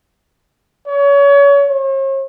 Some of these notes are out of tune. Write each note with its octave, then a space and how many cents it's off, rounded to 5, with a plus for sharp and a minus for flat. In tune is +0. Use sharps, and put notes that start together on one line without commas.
C#5 +30
C#5 -45